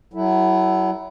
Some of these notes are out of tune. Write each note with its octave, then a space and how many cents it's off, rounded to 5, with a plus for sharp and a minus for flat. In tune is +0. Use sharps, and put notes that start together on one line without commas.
F#3 +30 E4 +0 A4 +0